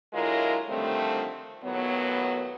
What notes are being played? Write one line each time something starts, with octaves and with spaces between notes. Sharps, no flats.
D3 F#3 G#3 E4 F4 A#4
D3 D#3 F3 G3 A3 C4
D#2 A2 F#3 B3